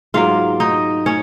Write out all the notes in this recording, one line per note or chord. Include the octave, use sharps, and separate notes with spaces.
G#2 F#3 A#3 F4 F5
D#4 D#5
C#4 C#5